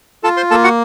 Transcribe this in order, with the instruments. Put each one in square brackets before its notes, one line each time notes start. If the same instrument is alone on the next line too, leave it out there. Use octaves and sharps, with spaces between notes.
[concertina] F4 A4 A5
C5 C6
A#3 A4 A5
F#4 F#5